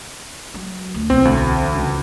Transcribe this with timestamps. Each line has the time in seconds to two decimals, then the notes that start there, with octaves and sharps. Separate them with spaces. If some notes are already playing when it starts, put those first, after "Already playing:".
0.54 F#3
0.94 D2
1.10 B1 E3 C4
1.25 D2
1.75 C#2